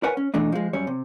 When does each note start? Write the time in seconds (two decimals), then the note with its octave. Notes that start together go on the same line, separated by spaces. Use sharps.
0.03 A#4 B4 C#5 F#5 G#5
0.17 C#4
0.34 B2 E3 A3 D4 D#4
0.52 F3 G#3
0.73 F#2 G3 C#5
0.87 C3